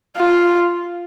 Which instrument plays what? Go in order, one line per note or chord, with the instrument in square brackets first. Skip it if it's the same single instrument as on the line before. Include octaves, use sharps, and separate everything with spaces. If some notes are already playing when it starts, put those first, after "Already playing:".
[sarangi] F4